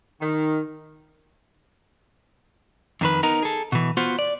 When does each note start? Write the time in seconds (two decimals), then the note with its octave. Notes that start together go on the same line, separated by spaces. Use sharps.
0.20 D#3
3.01 F2 D#3 B4
3.23 B3 D#4 A#4
3.42 G#4 A4
3.72 B2 E3
3.97 B3 F4 F#4 C5
4.19 D5